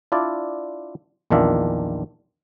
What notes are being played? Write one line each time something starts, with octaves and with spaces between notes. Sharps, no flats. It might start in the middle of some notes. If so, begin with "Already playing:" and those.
D4 E4 F4 D5
A#1 E2 D#3 D4 F4 E5